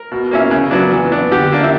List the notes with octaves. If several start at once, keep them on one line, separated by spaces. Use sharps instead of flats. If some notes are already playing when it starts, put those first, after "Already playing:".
Already playing: A#4
B2
A#3 C#4 E4
C#3
F#3 B3 D4
E3
B3 D4
D3 G4
A#3 D4
E4